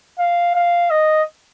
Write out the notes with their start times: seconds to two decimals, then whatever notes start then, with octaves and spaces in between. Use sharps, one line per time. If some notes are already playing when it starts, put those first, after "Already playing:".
0.18 F5
0.55 F5
0.91 D#5